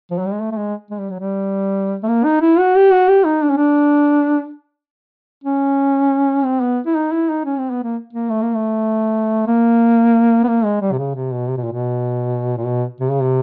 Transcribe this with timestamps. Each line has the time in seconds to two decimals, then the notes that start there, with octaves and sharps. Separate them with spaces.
0.11 F3
0.18 F#3
0.26 G3
0.33 G#3
0.40 A3
0.52 A3
0.57 G#3
0.90 G#3
1.00 G3
1.10 F#3
1.20 G3
2.03 A3
2.08 A#3
2.25 D#4
2.42 E4
2.59 F#4
2.76 G4
2.92 F#4
3.08 G4
3.25 D#4
3.43 D4
3.50 C#4
3.57 D4
5.44 C#4
6.44 C4
6.62 B3
6.86 E4
6.95 D#4
7.12 E4
7.29 D#4
7.45 C#4
7.59 C4
7.71 B3
7.83 A#3
8.13 A#3
8.30 A3
8.42 A#3
8.55 A3
9.47 A#3
10.44 B3
10.48 A#3
10.64 G#3
10.81 G3
10.92 C3
10.99 C#3
11.15 C3
11.32 B2
11.48 C3
11.57 B2
11.64 A#2
11.72 B2
12.57 A#2
12.66 B2
13.00 C3
13.11 C#3
13.22 C3